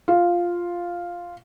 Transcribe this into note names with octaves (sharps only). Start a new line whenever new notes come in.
F4